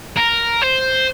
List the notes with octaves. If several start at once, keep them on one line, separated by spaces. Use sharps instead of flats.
A#4
C5